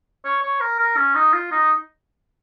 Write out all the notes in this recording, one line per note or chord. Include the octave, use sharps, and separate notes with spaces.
C#5
C#5
A#4
A#4
C#4
D#4
F4
D#4